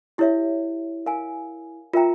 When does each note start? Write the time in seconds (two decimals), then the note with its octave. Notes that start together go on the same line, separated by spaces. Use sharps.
0.18 E4 G4 C#5 E5
1.06 A#4 F5 G#5
1.93 F4 A#4 E5 G5 A#5